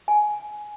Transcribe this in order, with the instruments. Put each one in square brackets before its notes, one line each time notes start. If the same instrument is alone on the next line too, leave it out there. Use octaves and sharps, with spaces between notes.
[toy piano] G#5